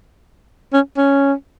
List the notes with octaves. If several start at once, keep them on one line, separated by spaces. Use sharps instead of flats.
C#4
C#4